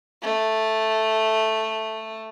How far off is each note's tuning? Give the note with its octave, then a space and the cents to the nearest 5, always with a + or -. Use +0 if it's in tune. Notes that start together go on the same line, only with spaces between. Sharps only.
A3 +0